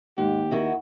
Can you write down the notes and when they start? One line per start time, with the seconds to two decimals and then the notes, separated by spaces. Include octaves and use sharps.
0.18 D#2 G#2 G4
0.51 D#3 E4 F#4